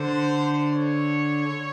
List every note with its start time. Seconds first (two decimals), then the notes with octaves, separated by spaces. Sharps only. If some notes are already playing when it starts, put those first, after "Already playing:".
Already playing: D3 C5
0.73 C#5